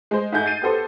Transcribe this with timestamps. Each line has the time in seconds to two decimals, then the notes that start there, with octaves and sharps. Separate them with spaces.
0.11 G#3 C5
0.32 G#2 A3 E5 G#5 G6
0.45 A6 C7 D#7
0.61 B3 G4 A4 C5